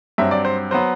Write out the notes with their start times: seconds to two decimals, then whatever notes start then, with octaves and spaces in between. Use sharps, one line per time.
0.18 G2 F#3 C4 E5
0.31 D5
0.45 C5
0.71 F#3 B3 C5